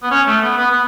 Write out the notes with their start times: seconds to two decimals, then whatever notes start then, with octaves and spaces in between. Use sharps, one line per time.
0.03 B3
0.11 C#4
0.27 A3
0.42 B3
0.57 B3
0.71 B3